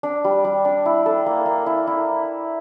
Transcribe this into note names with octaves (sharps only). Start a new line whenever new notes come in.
D4
G3
G3
D4
E4
A4
A#3
A#3
E4
E4